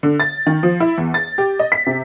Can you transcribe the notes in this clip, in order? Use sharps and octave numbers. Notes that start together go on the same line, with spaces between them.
D3
A6
D#3
F3
E4
E2
A6
G4
D#5
B6
C3